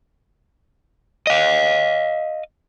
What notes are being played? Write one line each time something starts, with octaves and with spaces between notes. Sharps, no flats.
D#5 F5